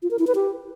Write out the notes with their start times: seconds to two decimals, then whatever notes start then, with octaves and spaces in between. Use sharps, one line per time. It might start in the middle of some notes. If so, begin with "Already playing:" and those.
0.03 F4
0.11 A#4
0.19 E4
0.27 B4
0.35 G4